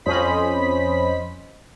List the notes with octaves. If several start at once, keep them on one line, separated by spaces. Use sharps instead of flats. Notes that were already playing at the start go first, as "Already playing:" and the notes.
F2 C#4 C5 D#5 B5 B6